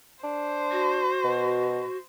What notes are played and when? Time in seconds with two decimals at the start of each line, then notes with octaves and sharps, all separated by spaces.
0.24 D4 C5
0.72 F#4
1.24 B2